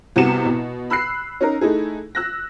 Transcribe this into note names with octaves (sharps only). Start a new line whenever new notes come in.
C2 C3 B3 F#4 C#7 E7
B2
B5 E6 F#6 C7
C#4 D#4 A#4
A3 D#4 E4 G#4
E6 F#6 A#6